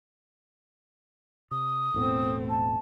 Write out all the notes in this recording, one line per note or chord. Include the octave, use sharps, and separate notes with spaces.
C3 D#6
E1 A2 A3 B3 C4
A5